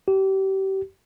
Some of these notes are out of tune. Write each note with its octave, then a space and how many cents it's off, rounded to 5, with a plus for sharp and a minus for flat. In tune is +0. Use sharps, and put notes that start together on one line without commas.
G4 -30